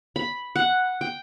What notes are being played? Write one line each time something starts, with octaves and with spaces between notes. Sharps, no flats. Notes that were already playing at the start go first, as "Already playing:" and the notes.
B5
F#5
G5